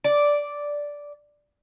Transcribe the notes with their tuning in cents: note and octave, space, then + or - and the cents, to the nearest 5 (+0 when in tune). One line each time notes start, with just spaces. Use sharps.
D5 -5